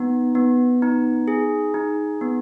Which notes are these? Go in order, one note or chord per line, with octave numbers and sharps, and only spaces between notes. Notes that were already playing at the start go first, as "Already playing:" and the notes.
Already playing: B3 D#4
B3
D#4
G#4
D#4
B3